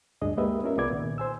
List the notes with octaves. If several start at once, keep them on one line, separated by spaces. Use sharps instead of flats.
D2 G2 D4 G#4 D#5
G#3 A#3 G4 B4 D#5 E5
B3 C#4 F4 A#4 E5
C2 B3 G#4 D5 D6 G#6
A#2 D#3
C5 G#5 E6